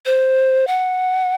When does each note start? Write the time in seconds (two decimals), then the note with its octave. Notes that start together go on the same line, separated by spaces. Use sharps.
0.06 C5
0.67 F#5